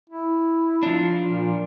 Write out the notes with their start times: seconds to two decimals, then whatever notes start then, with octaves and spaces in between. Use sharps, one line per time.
0.09 E4
0.83 F3 D4
1.30 A#2